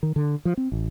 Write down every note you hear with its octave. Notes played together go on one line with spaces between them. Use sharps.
D#3
D3
F3
C4
A1